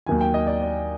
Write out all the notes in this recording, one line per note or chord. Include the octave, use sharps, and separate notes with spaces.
D#2 D#3 F#3 G#5
G5
D#5
D5
D5